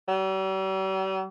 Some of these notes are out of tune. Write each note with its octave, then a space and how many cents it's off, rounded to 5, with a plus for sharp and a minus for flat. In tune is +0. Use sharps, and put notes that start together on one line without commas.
G3 -45